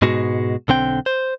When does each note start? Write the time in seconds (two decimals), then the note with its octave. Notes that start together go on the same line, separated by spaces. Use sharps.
0.02 G#2 B2 G#3 F#4
0.68 B1 D3 C4 G5
1.06 C5